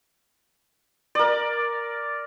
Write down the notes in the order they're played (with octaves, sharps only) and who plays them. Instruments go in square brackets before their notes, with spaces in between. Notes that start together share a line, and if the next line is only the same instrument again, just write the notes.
[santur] A#4 D5